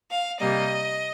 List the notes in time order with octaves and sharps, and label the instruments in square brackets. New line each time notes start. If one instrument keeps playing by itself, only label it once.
[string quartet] F5
C3 G3 A#3 D#5